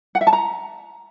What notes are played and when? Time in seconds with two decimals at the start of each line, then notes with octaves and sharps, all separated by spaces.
0.15 F#5
0.21 E5
0.27 A5
0.33 A#5